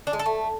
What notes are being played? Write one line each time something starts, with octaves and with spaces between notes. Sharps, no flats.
D4
G#3
A4
A3